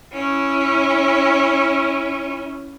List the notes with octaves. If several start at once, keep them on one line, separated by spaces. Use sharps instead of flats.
C#4 E4